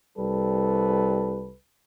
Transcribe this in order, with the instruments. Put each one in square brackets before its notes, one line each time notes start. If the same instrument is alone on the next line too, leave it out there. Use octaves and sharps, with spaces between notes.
[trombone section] C2 G3 A4 B4